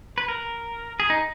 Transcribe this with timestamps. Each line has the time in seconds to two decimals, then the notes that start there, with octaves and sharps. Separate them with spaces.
0.18 B4
0.28 A#4
1.00 G#4
1.10 D#4